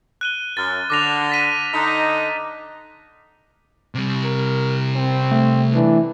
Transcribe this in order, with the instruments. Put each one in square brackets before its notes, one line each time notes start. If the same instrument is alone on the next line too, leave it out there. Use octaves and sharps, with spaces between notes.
[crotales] F#6 D#7 G7
[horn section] F#2 [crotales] F6 A6
[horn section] D3 [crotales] D6 A#6 F7
[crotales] A6 B6 D#7
[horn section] D3 D#4
[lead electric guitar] C3 G3
[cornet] A#4
C4
[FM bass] A3
[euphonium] E3 [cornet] D4